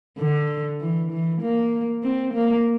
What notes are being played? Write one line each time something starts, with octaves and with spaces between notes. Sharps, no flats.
D3
E3
E3
A#3
C4
A#3